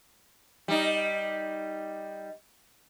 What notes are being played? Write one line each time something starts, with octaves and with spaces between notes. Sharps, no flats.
G3 D#4